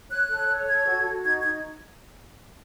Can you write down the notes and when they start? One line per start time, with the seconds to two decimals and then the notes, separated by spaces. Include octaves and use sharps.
0.10 C#5 F#6
0.28 A4
0.48 C#5
0.67 A4 G#6
0.86 F#4
1.05 F#4
1.23 D#4 G#6
1.41 D#4 G#6